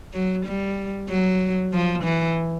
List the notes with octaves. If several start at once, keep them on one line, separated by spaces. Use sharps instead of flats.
F#3
G3
F#3
F3
E3